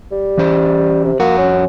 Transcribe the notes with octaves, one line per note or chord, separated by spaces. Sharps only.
G3
E3 C#4 C5
C3
F2 A#3 F#4 F#5
C#4